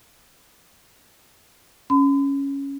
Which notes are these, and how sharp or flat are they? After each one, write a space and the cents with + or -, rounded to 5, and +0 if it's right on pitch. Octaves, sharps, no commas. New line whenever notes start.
C#4 +0 B5 +45